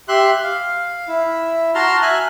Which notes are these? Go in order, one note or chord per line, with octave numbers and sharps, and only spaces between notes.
G4 E5 C6 F#6
F5
E4
F#4 A5 A#5 C6 F6
E5 G#5 F6 F#6